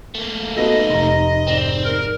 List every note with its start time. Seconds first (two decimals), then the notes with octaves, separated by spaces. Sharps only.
0.15 A3 A#3
0.56 B3 D#4 F#4 A4 B4 D#5
0.90 F1 A#5 C6
1.47 G#2 C4 D5
1.84 A#4